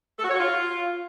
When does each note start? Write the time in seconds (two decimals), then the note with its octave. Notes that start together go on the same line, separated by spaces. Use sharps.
0.19 A4
0.25 F#4
0.30 C#5
0.35 F#4
0.40 F4